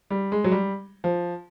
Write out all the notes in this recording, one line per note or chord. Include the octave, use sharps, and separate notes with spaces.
G3
G#3
F#3
G3
F3